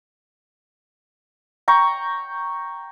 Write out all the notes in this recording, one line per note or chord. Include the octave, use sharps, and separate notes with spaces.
G5 A#5 C#6